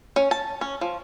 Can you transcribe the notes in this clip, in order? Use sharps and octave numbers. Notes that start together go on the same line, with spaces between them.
C#4
A5
C#4
F3